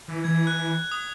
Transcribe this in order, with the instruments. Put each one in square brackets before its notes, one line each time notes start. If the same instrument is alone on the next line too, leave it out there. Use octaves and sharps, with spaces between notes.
[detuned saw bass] E3
[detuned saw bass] E3 [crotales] G#6
[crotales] F#6
D#6